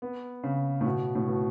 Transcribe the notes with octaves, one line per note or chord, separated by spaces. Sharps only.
B3
C#3
A2
B2
A2
B2